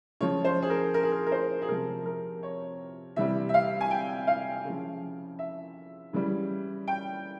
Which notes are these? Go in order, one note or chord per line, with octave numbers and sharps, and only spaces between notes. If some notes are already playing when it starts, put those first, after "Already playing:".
C#3 F3 C#5
C5
G#4
A#4
A#4
G#4
A#4
A#4
C5
G#4
C3 F3 A#4
A#4
C#5
C3 E3 G3 E5
E5
F5
G#5
G5
F5
C#3 F3
E5
C#3 E3 G3
G5